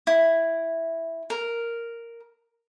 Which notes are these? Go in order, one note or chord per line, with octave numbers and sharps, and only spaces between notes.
E4
A#4